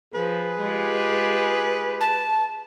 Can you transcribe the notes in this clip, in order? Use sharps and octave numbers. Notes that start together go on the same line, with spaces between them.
F3 G#4 B4
G#3 F4 G4
A5